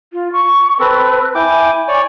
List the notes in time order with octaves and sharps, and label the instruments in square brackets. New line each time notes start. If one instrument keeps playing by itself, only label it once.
[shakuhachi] F4
C#6
[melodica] C4 A4 [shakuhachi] B4
[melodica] E4 G5 D6 [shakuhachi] G#5
[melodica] C#5 D5